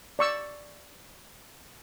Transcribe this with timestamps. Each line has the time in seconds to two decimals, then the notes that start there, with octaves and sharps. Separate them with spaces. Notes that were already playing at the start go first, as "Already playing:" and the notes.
0.19 D5 C#6 E6